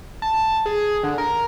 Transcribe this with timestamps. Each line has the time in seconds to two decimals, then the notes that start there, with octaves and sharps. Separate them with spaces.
0.22 A5
0.66 G#4
1.03 D3
1.18 A#4